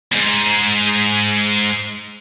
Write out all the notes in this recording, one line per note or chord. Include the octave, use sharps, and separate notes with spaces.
E2 G#2